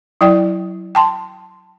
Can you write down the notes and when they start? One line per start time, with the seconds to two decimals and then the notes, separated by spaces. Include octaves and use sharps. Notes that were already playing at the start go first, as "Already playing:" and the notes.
0.21 F#3 E4 D5 G5
0.95 G5 A5 C6